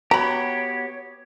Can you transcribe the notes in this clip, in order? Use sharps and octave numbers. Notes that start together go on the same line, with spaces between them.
B3 F#4 G4 C#5 A#5 B5